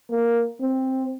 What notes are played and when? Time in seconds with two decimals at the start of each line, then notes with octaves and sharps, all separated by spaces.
0.10 A#3
0.61 C4